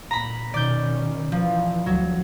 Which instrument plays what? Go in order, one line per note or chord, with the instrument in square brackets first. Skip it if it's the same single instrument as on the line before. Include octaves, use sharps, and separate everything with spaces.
[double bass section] A#2 [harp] A#5 B5
[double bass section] B2 D#3 C#4 [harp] D5 G6
[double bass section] E3 [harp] F3
[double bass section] D2 [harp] F#3